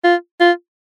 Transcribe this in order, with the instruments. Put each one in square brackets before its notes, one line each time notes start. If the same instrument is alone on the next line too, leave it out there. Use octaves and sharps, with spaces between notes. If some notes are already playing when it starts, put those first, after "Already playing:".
[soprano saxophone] F4
F4